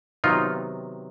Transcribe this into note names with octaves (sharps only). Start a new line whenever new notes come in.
C3 D#3 F#3 B3 D#4 F4